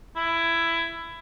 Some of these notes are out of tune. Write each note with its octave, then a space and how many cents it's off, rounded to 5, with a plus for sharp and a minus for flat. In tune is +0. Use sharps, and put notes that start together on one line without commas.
E4 +15